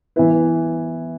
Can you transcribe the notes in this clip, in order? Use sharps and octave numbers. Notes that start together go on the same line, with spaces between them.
E3 B3 E4 B4